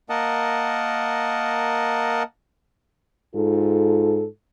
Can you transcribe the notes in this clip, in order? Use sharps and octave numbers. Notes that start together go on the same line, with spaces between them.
A#3 A#4 D#5 F#5 A5
G#2 F4 A4